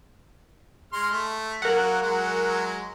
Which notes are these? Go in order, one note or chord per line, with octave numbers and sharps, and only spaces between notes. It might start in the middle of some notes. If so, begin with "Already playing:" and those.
G#3 C6 F6
A3
F#3 A#3 A#4 F#5
F#3 G#3